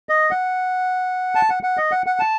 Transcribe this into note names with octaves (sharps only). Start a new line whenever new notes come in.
D#5
F#5
A5
F#5
F#5
D#5
F#5
F#5
A5